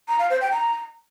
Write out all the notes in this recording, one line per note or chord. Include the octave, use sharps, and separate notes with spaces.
A#5
F5
C5
G5
A#5